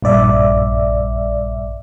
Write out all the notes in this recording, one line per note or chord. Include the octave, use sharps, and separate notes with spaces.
A#1 G2 D5 E5